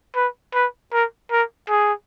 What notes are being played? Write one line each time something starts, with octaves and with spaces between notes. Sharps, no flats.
B4
B4
A#4
A#4
G#4